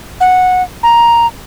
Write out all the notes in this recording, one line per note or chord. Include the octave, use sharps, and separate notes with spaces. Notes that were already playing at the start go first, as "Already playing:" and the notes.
F#5
A#5